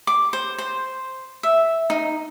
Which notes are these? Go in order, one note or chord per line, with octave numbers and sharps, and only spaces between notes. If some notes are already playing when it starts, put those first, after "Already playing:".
D6
C5
C5
E5
D#4